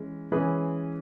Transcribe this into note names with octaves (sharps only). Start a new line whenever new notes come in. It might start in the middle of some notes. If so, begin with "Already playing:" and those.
Already playing: E3 G#3 C#4
E3 G#3 C#4 G#4 B4